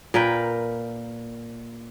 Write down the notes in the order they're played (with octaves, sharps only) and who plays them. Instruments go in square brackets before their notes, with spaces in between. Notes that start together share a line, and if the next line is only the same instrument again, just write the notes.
[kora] A#2 A#4 B4 G5